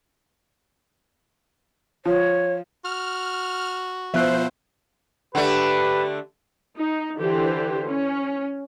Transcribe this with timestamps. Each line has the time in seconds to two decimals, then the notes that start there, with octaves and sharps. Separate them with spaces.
2.05 F3 C#5
2.85 F#4 F6
4.14 B2 F3 F4 C5 E5 F#6
5.35 D3 A3 G4 B4
6.74 D#4
7.16 D3 E3 G4 C5
7.87 C#4